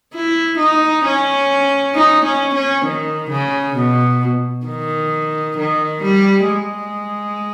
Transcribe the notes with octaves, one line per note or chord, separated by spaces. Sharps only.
E4
D#4
C#4
D#4
C#4
C#4
D#3
C#3
B2
D#3
D#3
G3
G#3